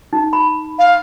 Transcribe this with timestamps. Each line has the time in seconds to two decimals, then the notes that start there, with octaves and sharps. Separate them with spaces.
0.13 D#4
0.33 B5
0.79 F5